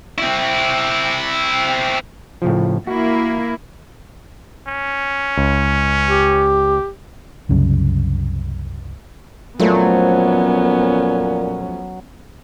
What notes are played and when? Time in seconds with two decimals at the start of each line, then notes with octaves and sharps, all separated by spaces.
0.18 C4 E4
2.42 A2 C#3 F3
2.87 A#3 E4 F#4
4.67 C#4
5.38 C#2
6.07 G4
7.49 C2 F#2 C#3
9.60 F2 A#2 F3 F#3 A3 B3 C#4